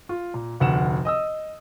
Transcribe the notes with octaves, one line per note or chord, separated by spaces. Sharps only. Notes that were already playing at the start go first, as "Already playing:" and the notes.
F4
A#2
F1 D2 F#5 E7
D#5 D#6 E6